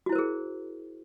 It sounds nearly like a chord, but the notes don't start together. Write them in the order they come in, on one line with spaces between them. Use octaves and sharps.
F#4 E4 C5 A#4 G#4